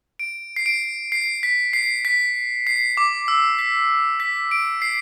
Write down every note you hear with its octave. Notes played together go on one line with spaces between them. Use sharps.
D7
C7
D7
C7
B6
C7
B6
C7
D6
E6
B6
B6
D7
C7